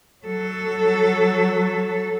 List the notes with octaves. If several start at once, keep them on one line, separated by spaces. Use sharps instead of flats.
F#3 A4